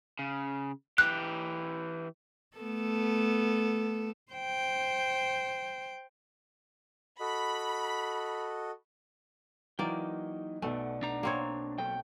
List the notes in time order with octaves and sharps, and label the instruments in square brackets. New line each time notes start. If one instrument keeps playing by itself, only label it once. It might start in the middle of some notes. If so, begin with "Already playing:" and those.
[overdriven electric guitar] C#3
[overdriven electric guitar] E3 G4 [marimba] F#6
[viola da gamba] A3 B3 A4
[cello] C5 G5
[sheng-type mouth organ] F#4 A4 D#5 [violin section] B5
[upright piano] E3 F#3 [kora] A#3 D5 [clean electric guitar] D#4 G5
[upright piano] B1 B2 [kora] A3 [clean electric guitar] D5 F#5 G#5
[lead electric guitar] D4 A#5
[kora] A#3 C4 C#5
[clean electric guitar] F#3 A4 [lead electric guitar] G5